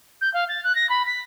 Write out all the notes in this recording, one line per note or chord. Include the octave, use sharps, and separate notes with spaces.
G6
F5
A6
F#6
A#6
B5
B6